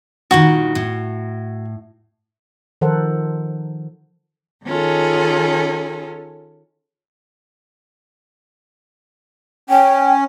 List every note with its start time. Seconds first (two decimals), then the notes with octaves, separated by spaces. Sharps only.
0.31 G2 A#2 D#3 F#4
0.75 A2
2.81 D#3 F3 A4 A#4 C5 F#5
4.65 D#3 C#4 F4 G#4 A4
9.70 C#4 G5